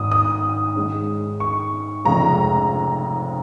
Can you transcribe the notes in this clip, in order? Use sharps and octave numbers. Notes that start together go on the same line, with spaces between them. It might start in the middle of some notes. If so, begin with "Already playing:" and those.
Already playing: G#1 G#2 D#6
D#6
G#2 D#3 G#3 C#4
C#6
F1 F2 C#3 F3 G#3 A#5